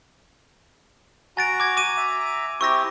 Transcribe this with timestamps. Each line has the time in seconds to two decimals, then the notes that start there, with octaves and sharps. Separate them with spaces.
1.37 F#4 G#5 A#5 A6 D7
1.60 D6 G#6
1.77 D6 D#7
1.97 E5 A#5
2.61 C4 E4 G4 C#6 E6 A#6